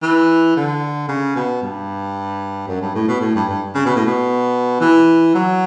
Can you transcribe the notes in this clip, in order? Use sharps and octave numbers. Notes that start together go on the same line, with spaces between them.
E3
D3
C#3
B2
G2
F#2
G2
A2
B2
A2
G2
G2
C#3
B2
A2
B2
E3
F#3